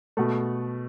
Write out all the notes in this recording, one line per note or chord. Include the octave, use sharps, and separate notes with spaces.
B2 A3